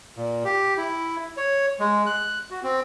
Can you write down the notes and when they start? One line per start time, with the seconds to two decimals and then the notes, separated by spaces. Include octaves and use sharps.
0.16 A#2
0.45 G4
0.78 E4
1.37 C#5
1.80 G#3
2.06 F#6
2.51 F#4
2.63 C4